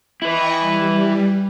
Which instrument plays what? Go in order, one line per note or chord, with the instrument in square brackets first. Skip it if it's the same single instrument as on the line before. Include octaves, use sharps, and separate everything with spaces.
[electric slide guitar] E4 B4 [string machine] D#5 G5 C#6
[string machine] G3